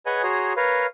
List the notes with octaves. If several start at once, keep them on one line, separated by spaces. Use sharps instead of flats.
G#4 B4 C#5 D#5 F#5 G#5
F#4 G#4 C#5 A#5 C6 D#6
A#4 B4 C#5 F5